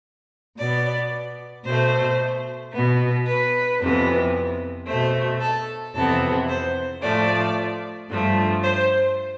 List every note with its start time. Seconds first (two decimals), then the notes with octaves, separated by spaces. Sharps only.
0.58 B2 B3 D5
1.65 B2 A3 C5
2.73 B2 B3
3.26 B4
3.80 F2 C3 E3 B3
4.87 B2 A3 C5
5.41 A4
5.94 F2 C3 E3 B3 A4
6.49 C5
7.02 A2 F3 A3 D5
8.09 G2 F3 A3
8.63 C5